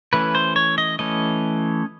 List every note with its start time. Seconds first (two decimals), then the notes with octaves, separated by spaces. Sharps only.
0.13 E3 A3 C#4 B4
0.35 C5
0.56 C#5
0.78 D#5
0.99 E3 A3 C#4 D#5